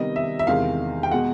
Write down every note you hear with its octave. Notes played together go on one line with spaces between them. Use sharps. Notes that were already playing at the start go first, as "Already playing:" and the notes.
Already playing: C3 D#3 G3 B3 D#5
E5
E5
E2 C3 D#3 G#3 F5
G5
B2 G#3 F#5